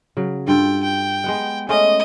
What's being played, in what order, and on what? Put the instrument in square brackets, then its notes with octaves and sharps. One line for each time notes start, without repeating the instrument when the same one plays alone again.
[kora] C#3 F#3
[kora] G2 F4 A4 [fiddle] G5
[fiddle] G5
[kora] G#3 B3 F#5
[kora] G#3 A3 C#4 [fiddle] D#5